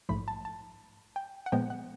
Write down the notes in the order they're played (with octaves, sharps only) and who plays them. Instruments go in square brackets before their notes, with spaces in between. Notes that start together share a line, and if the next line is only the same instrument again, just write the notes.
[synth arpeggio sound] A#1 G#2 F3 A3 B5
A5
A5
G5
F#5
A#2 F3 G#3 B3 G5
F#5